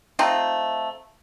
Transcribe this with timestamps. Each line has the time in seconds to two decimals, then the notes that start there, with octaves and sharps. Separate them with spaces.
0.19 A3 C4 D#4 F4